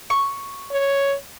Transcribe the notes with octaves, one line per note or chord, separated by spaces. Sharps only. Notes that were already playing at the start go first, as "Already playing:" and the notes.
C#6
C#5